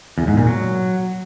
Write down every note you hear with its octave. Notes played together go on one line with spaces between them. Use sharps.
E2
G#2
A#2
F#3